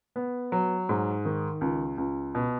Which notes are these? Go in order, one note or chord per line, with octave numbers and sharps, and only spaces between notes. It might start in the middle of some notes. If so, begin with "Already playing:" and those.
B3
F#3
G#2
D#3
C#2
C#2
B2